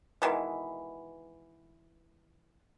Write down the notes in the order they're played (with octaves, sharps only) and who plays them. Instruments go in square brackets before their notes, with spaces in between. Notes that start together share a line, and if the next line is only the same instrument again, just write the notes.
[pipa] B2 D#3 E3 G#3